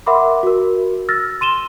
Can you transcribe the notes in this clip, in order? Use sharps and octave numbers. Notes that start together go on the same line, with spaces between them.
A#4 E5 F#5 B5 C6 D6
F#4 A#4
E6 F6 A6 A#6
C6 D#7 E7 G7